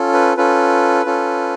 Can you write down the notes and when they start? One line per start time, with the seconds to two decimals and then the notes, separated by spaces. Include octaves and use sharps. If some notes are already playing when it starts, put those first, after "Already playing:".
Already playing: C#4 F4 A4
0.13 B4
0.37 C#4 F4 A4 B4
1.06 C#4 F4 A4